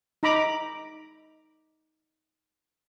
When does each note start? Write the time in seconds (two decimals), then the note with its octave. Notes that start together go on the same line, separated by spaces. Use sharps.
0.23 D#4 A#5 B5 D6